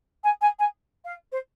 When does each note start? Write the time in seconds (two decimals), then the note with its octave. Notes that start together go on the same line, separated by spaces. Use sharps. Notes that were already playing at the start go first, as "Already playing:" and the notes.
0.24 G#5
0.41 G#5
0.59 G#5
1.05 F5
1.32 C5